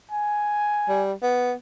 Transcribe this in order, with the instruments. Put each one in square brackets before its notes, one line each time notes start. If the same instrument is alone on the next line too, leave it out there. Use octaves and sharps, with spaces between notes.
[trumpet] G#5
[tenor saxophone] G3
B3